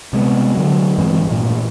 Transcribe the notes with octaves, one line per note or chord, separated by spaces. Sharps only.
C3 G#3 A3 B3
D3 F#3
G2 E3 G#3 C4
D1 A1 A#2